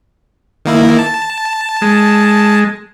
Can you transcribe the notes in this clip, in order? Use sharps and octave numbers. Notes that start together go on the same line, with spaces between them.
D#3 A#3 E4
A5
G#3